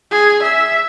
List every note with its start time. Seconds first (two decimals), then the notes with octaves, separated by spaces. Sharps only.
0.11 G#4
0.43 E5